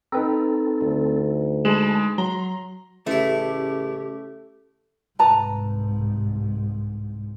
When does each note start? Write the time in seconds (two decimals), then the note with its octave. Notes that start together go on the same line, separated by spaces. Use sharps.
0.12 C4 D#4 A4 B4 A#5
0.82 D2
1.65 G#3 A5 B5
2.18 F#3 A#5 C6
3.07 A1 C#3 A3 E4 G4
5.19 C2 G#2 B4 A5 A#5